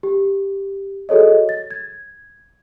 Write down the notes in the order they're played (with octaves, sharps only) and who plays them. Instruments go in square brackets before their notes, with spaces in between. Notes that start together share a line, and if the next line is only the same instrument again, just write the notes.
[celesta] G4
F#4 G#4 A4 C#5 D#5
A6
G#6